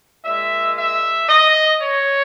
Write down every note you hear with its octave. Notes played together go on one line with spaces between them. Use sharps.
A#2 G#3 E5
E5
D#5
C#5